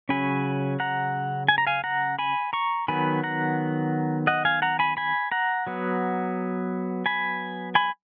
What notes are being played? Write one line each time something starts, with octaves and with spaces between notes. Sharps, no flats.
C#3 F#3 C#4 G#5 B5
F#5 A#5
G#5
A#5
F5 G#5
F#5 A#5
G#5 B5
A#5 C#6
D#3 F#3 B3 G#5 B5
F#5 A#5
D#5 F#5
F5 G#5
F#5 A#5
G#5 B5
G#5 B5
F#5 A#5
F#3 B3
G#5 B5
G#5 B5